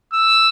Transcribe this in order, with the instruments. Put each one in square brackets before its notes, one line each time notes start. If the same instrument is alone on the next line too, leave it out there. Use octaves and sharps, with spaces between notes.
[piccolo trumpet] E6